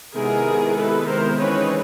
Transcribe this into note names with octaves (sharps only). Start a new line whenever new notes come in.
C3 D#3 G#3 B3 E4 G#4 A#4
A4 B4
A#4 C5
C#3 E3 G#3 C4 D#4 B4 C#5